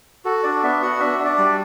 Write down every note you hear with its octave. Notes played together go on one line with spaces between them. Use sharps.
F#4 A4
D4 D5
B3 E5
F#4 F#5
D4 E5
D4
D5
G3